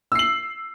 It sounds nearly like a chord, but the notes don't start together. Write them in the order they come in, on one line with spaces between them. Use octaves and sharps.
E6 C7 F#7